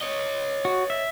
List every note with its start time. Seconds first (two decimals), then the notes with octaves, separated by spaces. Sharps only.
0.02 C#5 D#5
0.65 F#4
0.90 E5